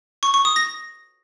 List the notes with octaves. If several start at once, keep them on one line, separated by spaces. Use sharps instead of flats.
C#6
C#6
D#6
A#6